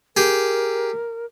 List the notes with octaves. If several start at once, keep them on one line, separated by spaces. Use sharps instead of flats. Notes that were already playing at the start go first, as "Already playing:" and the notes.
G4 G#4 A#4